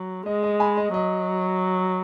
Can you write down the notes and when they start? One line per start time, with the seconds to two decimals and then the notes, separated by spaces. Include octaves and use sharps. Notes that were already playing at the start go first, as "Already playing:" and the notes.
Already playing: F#3
0.26 G#3 D#5
0.43 D#5
0.60 G#5 B5
0.77 D#5
0.94 F#3 D#5